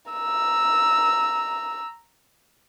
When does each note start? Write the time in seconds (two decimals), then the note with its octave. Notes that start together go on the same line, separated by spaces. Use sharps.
0.12 A#5 E6